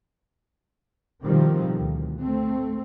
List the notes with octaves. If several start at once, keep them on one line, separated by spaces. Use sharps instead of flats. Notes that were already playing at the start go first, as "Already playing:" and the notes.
B2 D3 D#3 F3 G3 C4
D2
A3 C4